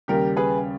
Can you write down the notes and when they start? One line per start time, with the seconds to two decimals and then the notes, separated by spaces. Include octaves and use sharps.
0.08 D#2 C#3 G3 G4 A#4
0.36 G#4 B4